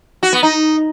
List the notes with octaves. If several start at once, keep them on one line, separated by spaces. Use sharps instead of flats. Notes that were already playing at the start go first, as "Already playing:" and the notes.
F#4
B3
D#4